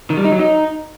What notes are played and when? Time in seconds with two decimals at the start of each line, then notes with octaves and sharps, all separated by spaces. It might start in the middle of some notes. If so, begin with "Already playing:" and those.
0.10 D#3
0.17 G3
0.25 D#4
0.32 F#3
0.39 D#4